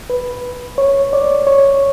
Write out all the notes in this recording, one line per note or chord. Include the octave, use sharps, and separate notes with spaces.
B4
C#5
D5
C#5